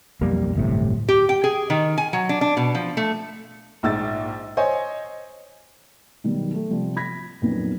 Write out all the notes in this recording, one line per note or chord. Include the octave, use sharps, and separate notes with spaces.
B1 F2 G3 A#3
D1 G1 A2 C3
G4
G5
G#4
D#3
G#5
F#3
D4
D4
B2
F3
A3
A#1 G#2 E6 A6
C5 C#5 D#5 G#5
B2 D#3 F#3 G3
A3
C3 F3 G3
B5 G#6 A#6 B6
F2 A#2 F#3 B3 C#4 D#4